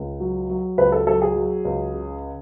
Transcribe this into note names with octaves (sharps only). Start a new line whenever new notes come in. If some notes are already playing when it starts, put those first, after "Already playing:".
Already playing: C#2
F#3
F#3
C#2 B4
A4
F#3 A4
G#4
F#3
C#2
C#3